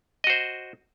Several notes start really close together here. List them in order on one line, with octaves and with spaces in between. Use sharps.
D#5 F#4 C5